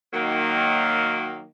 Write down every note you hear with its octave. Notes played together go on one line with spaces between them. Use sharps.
D#3 F#3 A#3